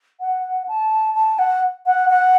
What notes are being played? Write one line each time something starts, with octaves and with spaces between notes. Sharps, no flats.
F#5
A5
A5
F#5
F#5
F#5